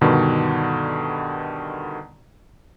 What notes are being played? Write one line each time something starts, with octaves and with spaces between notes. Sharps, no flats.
G2 B2 D3 D#3